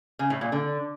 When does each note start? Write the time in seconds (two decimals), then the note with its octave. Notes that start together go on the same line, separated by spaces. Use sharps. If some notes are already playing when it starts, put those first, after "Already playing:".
0.19 C#3
0.30 A2
0.41 A#2
0.52 D3